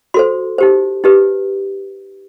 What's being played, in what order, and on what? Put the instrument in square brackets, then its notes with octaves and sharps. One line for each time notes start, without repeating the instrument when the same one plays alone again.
[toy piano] F#4 A4 C5 C6
D#4 G4 C5
D#4 G4 B4